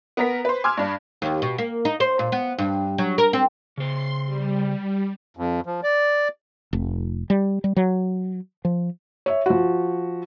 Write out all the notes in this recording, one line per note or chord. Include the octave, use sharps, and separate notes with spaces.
B3 A#4 B6
B4 C5
G#5 C6 D6 E6 F6 G#6
G2 D4
D#2
B2
A#3
D#4
C5
A#2
B3
G2
F#3
A#4
C4
C#3 C5 C6
G3
F2
F3
D5
F1
G3
G3
F#3
F3
C#5 E5
F3 F#4